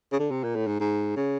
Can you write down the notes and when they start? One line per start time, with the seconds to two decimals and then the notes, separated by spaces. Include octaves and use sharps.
0.12 C#3
0.19 D3
0.31 C3
0.43 A#2
0.55 A2
0.67 G#2
0.80 G#2
1.17 C#3